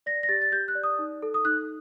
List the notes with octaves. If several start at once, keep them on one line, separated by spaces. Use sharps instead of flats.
D5 A#6
A#6
G4 A6
A6
G4 G6
F#6
D5
D#6
D#4
A4
D#6
D#4 F#6